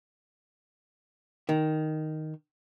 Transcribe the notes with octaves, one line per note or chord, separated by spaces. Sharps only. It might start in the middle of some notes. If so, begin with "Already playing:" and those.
D#3